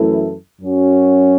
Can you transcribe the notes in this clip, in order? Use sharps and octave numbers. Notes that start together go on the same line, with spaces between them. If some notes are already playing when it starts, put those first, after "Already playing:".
Already playing: F#2 E3 A3 E4 A4
F#2 F#3 C#4 F#4